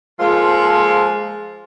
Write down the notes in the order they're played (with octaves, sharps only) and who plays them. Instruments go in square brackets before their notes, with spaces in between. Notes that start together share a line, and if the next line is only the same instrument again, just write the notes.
[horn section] F3 G#3 A#3 F4 A4 C5